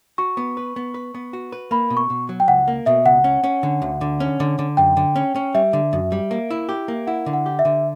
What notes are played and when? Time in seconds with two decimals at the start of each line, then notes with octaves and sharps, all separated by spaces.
0.18 F#4 C#6
0.37 B3
0.57 B4
0.76 B3
0.94 B4
1.15 B3
1.33 F#4
1.52 B4
1.71 A#3 B5
1.90 B2
1.97 C#6
2.10 B2
2.29 F#3
2.40 G5
2.48 C#2 F#5
2.68 A#3
2.86 B2 E5
3.05 C#2 F#5
3.24 C#4
3.44 C#4
3.63 D3
3.82 D2
4.01 D3
4.20 C#4
4.40 D3
4.59 D3
4.77 F#2 G5
4.97 D3
5.16 C#4
5.36 C#4
5.55 G3 E5
5.73 D3
5.93 F#2
6.12 G3
6.31 A#3
6.50 E4
6.69 G4
6.88 A#3
7.07 E4 F#5
7.26 D3
7.33 F#5
7.46 G4
7.59 E5
7.65 D3